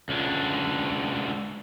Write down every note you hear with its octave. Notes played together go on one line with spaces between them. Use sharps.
C#2 D3